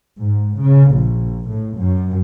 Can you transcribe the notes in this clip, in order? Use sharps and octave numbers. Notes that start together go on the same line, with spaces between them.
G#2
C#3
A#1
A2
F#2